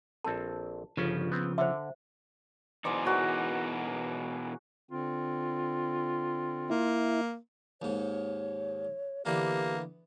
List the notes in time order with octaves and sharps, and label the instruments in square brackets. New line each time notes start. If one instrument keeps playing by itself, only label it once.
[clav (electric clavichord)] A#1 C4 A4 [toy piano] A5
[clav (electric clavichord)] G1 C#4 [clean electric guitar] C#3 F3
[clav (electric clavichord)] B3 C4
[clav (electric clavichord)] D3 F#5 [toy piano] C5 E5
[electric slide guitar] B2 E3 D#4 [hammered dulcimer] G#4 C5 D5
[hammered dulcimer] F#4 A#4 C#5
[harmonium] D3 C4 [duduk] F4
[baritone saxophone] A#3 [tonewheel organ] E4
[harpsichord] D#2 G#2 [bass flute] C#5
[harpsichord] D3 E3 B3 [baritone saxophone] A#3 [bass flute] G4